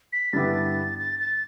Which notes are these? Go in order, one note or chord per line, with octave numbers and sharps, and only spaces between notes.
B6
G2 D3 B3 E4 G4 A6
A6
A6